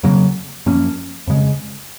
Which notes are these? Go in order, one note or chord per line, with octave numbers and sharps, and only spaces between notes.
F2 C#3 F#3 A#3
F#2 F3 A#3 C#4
F2 C#3 G#3